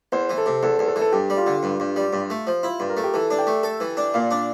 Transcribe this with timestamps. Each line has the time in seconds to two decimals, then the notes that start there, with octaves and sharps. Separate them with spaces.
0.12 E2 C5
0.30 E3
0.38 A4
0.46 C3
0.63 E2 A4
0.79 E2
0.88 A4
0.96 E3
1.01 A4
1.12 G2 G4
1.30 G3
1.37 F4
1.46 D3
1.63 G2
1.80 G2
1.96 G3
2.13 G2
2.30 A3
2.47 F3
2.63 E4 F4
2.80 G2
2.89 A#4
2.97 A3
3.04 G4
3.14 E3 A4
3.31 D4
3.39 G5
3.47 A3
3.63 A4
3.80 E3
3.97 D4
4.14 A#2 F5
4.31 D4